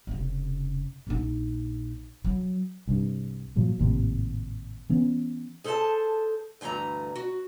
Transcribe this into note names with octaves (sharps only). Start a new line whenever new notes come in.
F1 C#3
A#1 D#4
F#3
C2 G2
G2 A#2 F3 F#3
G#1 D#2 A2 C3
E3 B3 C#4
G#4 A4 C5 E5 A5
D2 G2 E3 A3 A#5
F#4